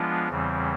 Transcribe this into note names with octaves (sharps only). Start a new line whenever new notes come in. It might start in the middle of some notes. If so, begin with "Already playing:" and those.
Already playing: F3 G#3 B3 D4 F4
E2 C#3 E3 G3 C4